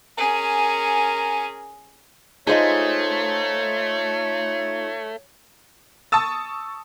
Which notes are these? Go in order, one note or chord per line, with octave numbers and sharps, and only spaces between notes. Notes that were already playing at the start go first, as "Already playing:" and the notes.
C#4 G#4 A#4
A3 D#4 F4 G#4 C5 C#5 D#5
A5 C#6 D#6 E6 A6